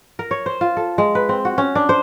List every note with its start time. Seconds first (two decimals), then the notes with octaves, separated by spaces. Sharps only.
0.19 A#4
0.31 C#5
0.46 C5
0.61 F4
0.77 A4
0.98 G#3
1.15 B4
1.29 C4
1.45 F#4
1.58 C#4
1.75 D4
1.89 C5